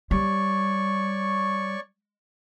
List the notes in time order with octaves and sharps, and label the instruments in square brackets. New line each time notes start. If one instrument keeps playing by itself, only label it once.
[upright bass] G3 [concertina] C#5 D5 C#6